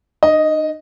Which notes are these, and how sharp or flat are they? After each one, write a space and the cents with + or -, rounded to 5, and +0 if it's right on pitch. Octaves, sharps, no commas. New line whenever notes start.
D#4 -45 D#5 +0